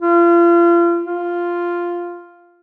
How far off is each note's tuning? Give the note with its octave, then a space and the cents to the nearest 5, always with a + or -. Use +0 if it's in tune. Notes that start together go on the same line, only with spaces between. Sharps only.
F4 -35
F4 -5